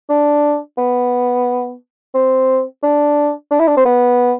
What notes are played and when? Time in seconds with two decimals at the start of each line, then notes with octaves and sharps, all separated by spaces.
0.10 D4
0.78 B3
2.14 C4
2.83 D4
3.51 D4
3.60 E4
3.68 D4
3.77 C4
3.85 B3